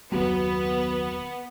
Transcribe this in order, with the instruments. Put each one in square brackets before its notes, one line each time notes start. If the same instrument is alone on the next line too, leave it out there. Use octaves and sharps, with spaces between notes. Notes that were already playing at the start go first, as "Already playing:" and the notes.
[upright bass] F#1 D#2 [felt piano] F#3 [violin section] B3